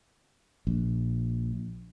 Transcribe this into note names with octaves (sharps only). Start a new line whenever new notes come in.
A#1